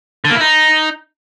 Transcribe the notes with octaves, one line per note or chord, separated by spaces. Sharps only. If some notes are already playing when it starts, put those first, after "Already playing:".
D3
A#3
E4
D#4